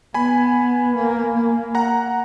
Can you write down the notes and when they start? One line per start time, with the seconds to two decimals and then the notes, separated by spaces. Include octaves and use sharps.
0.14 B3 G#5 B5
0.95 A#3
1.35 A#3
1.75 F#5 A#5